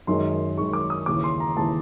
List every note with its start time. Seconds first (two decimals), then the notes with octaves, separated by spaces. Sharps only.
0.07 F#2 D#3 G#3 C6
0.57 F#2 D#3 G#3 C#6
0.73 D6
0.90 D#6
1.06 D#2 C#3 E3 D6
1.24 C6
1.40 A#5
1.57 D#2 C#3 E3 A5